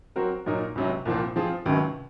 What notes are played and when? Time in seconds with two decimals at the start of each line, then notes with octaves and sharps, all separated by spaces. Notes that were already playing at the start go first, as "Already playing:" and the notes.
0.16 F#3 C4 F#4 A#4
0.46 A#2 F#3 A#3 D#4 A#4
0.75 C#2 C3 F#3
1.05 C2 A#2 F3 C4
1.36 F3 C4 F4 G#4
1.65 C#2 C3 D#3 F#3 C#4